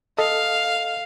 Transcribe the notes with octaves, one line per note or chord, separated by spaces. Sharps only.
A4 D#5 F5